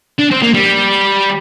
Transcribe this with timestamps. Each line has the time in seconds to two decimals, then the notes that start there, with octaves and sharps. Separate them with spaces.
0.19 D4
0.31 C4
0.42 A#3
0.54 G3